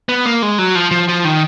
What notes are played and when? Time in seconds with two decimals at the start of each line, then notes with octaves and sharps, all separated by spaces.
0.09 B3
0.26 A#3
0.42 G#3
0.59 F#3
0.75 F3
0.91 F3
1.08 F3
1.25 D#3